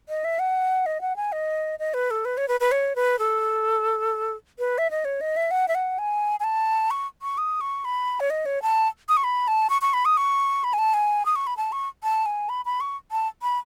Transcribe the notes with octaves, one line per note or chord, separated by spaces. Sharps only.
D#5
E5
F#5
D#5
F#5
G#5
D#5
D#5
B4
A4
B4
C#5
B4
B4
C#5
B4
A4
B4
E5
D#5
C#5
D#5
E5
F#5
E5
F#5
G#5
G#5
A5
C#6
C#6
D#6
C#6
B5
C#5
D#5
C#5
A5
D#6
C#6
B5
A5
C#6
C#6
B5
D#6
C#6
B5
G#5
A5
G#5
D#6
C#6
B5
A5
C#6
A5
G#5
B5
B5
C#6
A5
B5